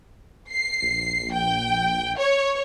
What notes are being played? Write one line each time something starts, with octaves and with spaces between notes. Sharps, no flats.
C7
A#1
G5
C#5